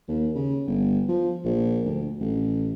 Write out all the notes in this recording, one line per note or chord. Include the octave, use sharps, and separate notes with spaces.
D#2
C#3
G1
F3
A#1
D2
A1